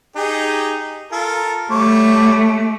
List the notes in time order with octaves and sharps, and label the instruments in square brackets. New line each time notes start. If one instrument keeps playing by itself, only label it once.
[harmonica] D#4 G4 G#4
F4 A4 A#4
[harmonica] G3 C#5 D6 [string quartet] A3